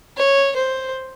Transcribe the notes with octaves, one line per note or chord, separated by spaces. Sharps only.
C#5
C5